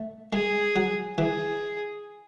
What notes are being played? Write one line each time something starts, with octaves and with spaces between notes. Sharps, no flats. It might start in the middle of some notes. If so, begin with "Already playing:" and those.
Already playing: A3
G#3 G#4
F#3
E3 G#4